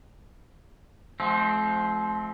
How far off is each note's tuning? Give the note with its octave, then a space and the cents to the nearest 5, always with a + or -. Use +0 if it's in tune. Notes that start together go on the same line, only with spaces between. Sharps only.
F3 +0 A3 -45 C4 +0